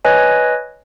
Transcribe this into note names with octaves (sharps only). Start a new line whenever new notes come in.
B4 C#5 D#5 G#5